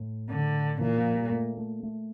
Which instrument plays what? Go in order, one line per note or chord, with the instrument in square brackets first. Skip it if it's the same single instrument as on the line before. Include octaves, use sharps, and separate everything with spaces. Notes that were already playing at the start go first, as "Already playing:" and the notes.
Already playing: [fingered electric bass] A2
[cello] D3
[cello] A#2 [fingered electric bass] E3
[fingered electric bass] F3
G3
A3
A3
A3